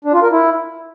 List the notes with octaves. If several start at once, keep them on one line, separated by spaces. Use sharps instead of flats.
D4
F4
A#4
E4